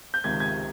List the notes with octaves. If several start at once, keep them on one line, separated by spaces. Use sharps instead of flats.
G6
C#2 C3 D#3 G#6
G#6